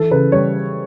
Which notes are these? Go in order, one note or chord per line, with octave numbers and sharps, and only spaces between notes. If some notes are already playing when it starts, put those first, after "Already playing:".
Already playing: E3 A4
C#3 B4
G3 C#5